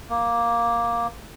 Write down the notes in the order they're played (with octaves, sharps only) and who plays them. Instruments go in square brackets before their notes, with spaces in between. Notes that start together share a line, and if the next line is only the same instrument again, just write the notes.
[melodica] A#3